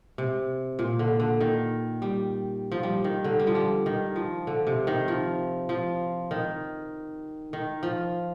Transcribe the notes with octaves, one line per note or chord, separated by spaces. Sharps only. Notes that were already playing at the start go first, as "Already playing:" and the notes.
C3
A#2
D3
D3
D#3
G3
F3
G3
D#3
D3
G3
F3
G3
D#3
F3
D3
C3
D#3
F3
F3
D#3
D#3
F3